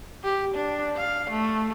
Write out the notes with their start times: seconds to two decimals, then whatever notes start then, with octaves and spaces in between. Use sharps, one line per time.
0.24 G4
0.55 D4
0.97 F5
1.31 A3